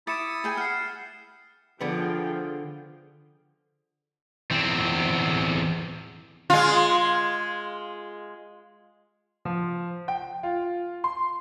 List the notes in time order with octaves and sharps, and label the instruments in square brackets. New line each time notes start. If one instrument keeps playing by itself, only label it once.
[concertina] E4 D#6 [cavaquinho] D6 [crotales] A6 C#7 E7
[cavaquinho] G#4 G5 G#5
[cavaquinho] F#5 [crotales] F6 C7
[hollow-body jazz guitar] D3 B3 [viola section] F3 G#4 G5
[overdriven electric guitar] E2 C4
[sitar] G#3 F4
[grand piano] F3
G5
F4
C6